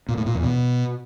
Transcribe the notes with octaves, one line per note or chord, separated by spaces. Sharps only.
A#2
A2
A#2
E2
B2